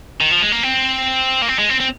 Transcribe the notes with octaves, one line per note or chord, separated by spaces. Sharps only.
D#3
F3
G#3
A#3
C4
A#3
C4
G#3
C4
C4